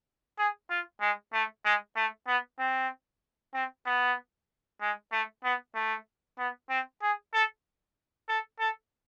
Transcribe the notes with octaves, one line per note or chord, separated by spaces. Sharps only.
G#4
F4
G#3
A3
G#3
A3
B3
C4
C4
B3
G#3
A3
B3
A3
B3
C4
G#4
A4
A4
A4